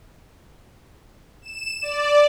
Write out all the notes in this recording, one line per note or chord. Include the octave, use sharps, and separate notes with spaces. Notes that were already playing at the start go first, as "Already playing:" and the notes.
E7
D5